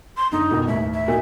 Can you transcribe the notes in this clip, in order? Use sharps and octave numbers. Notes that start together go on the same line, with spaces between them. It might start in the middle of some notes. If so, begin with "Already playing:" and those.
C6
F#1 D3 D#4
F2 B2 D#3
A1 D#2 E5
E5
A#2 D#4 F#4